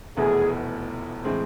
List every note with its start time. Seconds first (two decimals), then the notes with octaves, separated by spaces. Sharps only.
0.17 F1 E2 B2 A3 E4 G#4
1.24 A2 E3 G#3 C4